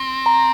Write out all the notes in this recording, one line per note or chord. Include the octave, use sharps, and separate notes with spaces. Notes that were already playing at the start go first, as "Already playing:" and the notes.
Already playing: C4
A#5